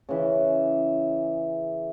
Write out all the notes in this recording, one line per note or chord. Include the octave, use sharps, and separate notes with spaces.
C#3 E3 E5